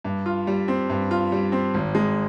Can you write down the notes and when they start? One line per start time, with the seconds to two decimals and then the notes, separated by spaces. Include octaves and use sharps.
0.05 G2
0.26 F4
0.47 G3
0.68 C4
0.90 G2
1.11 F4
1.32 G3
1.52 C4
1.74 G#1
1.95 G#3